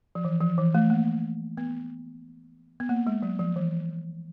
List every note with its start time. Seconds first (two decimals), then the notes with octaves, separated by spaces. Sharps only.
0.15 F3
0.25 E3
0.40 F3
0.58 E3
0.75 A3
0.90 A#3
1.57 B3
2.80 B3
2.89 A#3
3.07 G#3
3.22 F#3
3.39 F3
3.56 E3